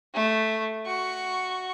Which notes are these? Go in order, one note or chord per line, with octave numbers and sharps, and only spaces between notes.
A3
F#4 C#6